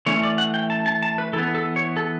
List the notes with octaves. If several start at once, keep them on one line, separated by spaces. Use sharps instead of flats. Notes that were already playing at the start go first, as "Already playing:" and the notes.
E3 A3 C#4 C#5
D5
F#5
G5
A5
A5
A5
B4
E3 A4
B3
A4
C#5
A4